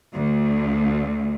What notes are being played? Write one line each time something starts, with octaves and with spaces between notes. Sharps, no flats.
D2